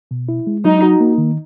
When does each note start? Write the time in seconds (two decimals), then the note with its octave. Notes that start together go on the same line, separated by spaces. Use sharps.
0.11 B2
0.29 E4
0.47 G#3
0.64 F#3 D#4
0.82 F#4
1.00 A#3
1.18 D#3